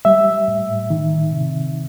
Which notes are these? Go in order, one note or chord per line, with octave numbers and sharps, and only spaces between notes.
G3 E5
A2
D#3
C3